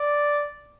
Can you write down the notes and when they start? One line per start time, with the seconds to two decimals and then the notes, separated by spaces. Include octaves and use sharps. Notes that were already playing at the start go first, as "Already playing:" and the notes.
Already playing: D5